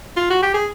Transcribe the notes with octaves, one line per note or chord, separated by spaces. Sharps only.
F4
F#4
G4
G#4